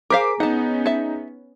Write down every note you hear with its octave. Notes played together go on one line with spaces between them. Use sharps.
G#4 A#4 C5 F5 G#5 A#5 D6 B6
B3 C#4 D#4 F#5 A5
E5 A5